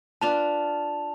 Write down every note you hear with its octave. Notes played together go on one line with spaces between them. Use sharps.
D4 F4 B4 A5 F7